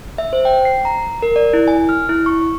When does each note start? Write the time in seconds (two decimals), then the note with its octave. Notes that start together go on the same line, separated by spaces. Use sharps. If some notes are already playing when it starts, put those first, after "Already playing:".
0.18 E5
0.33 C5
0.45 G5
0.65 C7
0.85 A#5
1.22 A#4
1.36 D5
1.53 E4
1.68 G#5
1.89 F6
2.09 E4
2.26 C#6